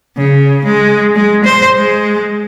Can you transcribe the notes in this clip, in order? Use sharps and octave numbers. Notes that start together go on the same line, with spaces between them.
C#3
G#3
G#3
C5
G#3